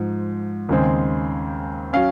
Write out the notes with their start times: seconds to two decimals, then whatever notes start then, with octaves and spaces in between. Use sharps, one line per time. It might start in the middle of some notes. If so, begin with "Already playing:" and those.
Already playing: G#2 F3
0.69 D#2 C#3 G#3 C4
1.93 F#3 C#4 F5